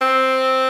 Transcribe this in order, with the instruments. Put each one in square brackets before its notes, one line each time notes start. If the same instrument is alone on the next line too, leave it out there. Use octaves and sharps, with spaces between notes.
[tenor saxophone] C4